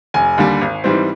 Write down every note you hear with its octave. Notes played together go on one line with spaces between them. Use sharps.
F1 G#5
D#2 D3 G3
G#1
G#2 E3 G3 C4